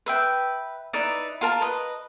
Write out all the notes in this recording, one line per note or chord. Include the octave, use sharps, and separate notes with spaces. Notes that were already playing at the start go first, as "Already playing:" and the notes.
B4 E5 G5
D#4 E4 B4 D5
F4 A#4 A5
B4 D#5